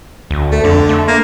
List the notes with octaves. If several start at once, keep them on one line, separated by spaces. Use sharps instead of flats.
D2
A3
F2 D3
A3
A#3